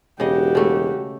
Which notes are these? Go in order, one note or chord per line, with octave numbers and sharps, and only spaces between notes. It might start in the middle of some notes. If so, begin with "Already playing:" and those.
E1 C#3 F#4 G4 D#5
C#3 A3